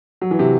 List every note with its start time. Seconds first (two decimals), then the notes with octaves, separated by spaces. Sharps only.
0.21 F#3
0.31 E3
0.39 C3